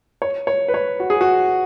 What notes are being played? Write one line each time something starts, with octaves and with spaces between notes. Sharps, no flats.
C#5
C#5
B4
C#5
F#4
G#4
F#4